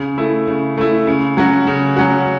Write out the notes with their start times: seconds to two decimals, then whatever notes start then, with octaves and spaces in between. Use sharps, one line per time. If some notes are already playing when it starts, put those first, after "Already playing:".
Already playing: C#3
0.18 A3 E4
0.47 C#3
0.77 A3 E4
1.07 C#3
1.37 F#3 C#4 F#4
1.67 C#3
1.96 F#3 C#4 F#4